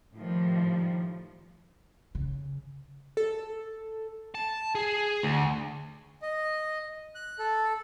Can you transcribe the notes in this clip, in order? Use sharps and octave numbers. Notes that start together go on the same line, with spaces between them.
A2 D#3 F3 G3
C#3
A4
A5
G#4
D2
D#5
F#6
A4